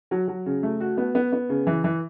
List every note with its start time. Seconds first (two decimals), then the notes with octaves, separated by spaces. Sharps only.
0.11 F#3
0.28 F#3
0.46 C#3
0.63 A3
0.80 F#4
0.98 B3
1.15 B3
1.33 B3
1.49 C#3
1.67 E3
1.84 E3